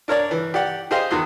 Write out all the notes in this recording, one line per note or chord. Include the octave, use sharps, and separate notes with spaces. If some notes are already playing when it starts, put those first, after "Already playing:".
D4 A#4 C#5 D5
E3
G4 D5 F#5
G4 G#4 C5 D#5 F5 C6
E2 D#3 F#4 C6 D#6